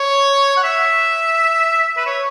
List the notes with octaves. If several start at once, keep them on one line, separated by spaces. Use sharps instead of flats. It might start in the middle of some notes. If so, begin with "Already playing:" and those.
Already playing: C#5
F#5
E5
B4
C#5